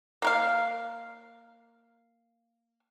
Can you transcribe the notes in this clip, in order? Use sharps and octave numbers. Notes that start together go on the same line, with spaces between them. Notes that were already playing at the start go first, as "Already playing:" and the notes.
A#3 A#4 F5